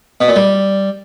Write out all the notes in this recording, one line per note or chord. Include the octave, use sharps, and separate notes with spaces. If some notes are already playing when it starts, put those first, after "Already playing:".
B2
A#2
G3